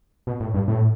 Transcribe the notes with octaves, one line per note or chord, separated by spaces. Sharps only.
B2
A2
G2
A2